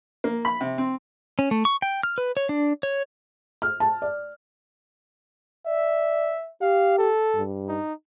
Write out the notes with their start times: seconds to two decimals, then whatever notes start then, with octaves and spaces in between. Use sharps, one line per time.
0.24 A#3
0.45 B5
0.61 C3
0.78 C4
1.39 C#4
1.51 A3
1.65 C#6
1.82 G5
2.03 F6
2.18 B4
2.37 C#5
2.49 D4
2.83 C#5
3.62 F6
3.80 A5
4.02 D5
5.67 D5 E5
6.61 G4 F5
6.99 A4
7.35 G2
7.68 D#4